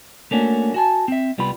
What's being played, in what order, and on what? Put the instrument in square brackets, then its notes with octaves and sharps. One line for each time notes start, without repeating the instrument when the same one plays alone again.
[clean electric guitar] A3 A#3 C#4 D4 F#4
F#4 G#5 A5
C4 E5
C2 G3 B3 F4 B5